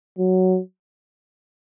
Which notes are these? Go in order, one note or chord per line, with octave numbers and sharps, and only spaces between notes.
F#3